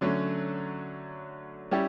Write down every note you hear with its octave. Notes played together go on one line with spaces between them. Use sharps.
D3 F#3 A3 C#4
G3 C#4 E4 G4